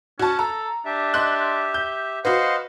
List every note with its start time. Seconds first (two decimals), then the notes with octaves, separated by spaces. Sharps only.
0.19 C#4 F#4 A5
0.39 A4 A#5
0.85 D4 G4 E5
1.14 D#5 C6 F#6
1.74 G6
2.25 F#4 B4 C5 D#5 F5 F#5